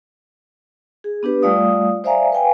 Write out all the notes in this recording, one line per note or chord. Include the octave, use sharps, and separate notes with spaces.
G#4
B3 D4 G4 B4
G3 A3 F4 D5 F5 D#6
C5 D5 E5 F5 G#5 A#5
B4 F5 G5 G#5